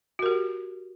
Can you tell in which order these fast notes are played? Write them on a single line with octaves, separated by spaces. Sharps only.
F#4 A#4 G4